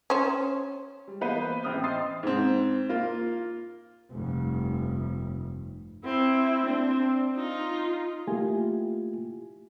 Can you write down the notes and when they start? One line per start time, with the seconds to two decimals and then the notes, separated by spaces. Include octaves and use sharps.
0.10 C#4 C5
1.08 G3
1.21 E3 A#3 B3 B4 C5
1.63 A1 C4 E5 D#6 F6 G6
1.84 D#5 C6 D#6 E6 A6 C7
2.23 G#2 C4
2.89 A#3 F4
4.11 F1 G2
6.04 C4 E4
6.67 C4 D4
7.35 D#4 F4
8.27 A3 A#3 E4 F4 G4 G#5